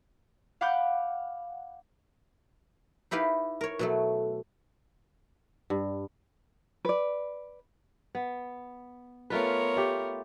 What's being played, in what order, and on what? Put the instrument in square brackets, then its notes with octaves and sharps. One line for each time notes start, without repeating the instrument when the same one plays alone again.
[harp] F5 F#5 B5 D6 F#6 G6
[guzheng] D#4 E4 G4 B4 F5
A#4 C#5
B2 F#3 A3
[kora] G2
[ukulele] B4 D5
[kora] B3
[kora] A3 F4 B4 [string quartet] B3 A#4 C#5
[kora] A3 G4